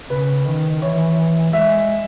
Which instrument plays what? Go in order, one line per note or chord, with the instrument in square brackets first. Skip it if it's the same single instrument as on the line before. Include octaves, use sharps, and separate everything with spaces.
[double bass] C#3 [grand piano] B4
[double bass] D#3
[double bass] E3 [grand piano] C#5
[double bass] G#3 [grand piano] E5